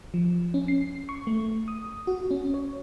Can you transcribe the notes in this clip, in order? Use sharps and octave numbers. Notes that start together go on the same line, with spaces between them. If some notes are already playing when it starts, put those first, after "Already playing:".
F3
C#4
C7
C#6
A3
D#6
F#4
C#4
C#5